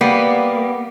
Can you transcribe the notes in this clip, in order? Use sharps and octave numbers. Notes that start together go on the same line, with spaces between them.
G3 A#3 B3